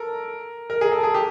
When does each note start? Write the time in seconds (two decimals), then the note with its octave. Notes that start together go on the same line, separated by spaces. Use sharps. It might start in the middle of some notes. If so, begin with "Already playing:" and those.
Already playing: A4 A#4
0.70 A#4
0.81 G#4
0.92 A4
1.03 G#4
1.14 G4